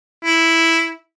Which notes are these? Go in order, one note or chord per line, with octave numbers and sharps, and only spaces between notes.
E4